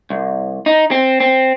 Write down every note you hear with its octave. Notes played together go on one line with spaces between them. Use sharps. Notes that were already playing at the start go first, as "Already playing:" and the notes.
C2
D#4
C4
C4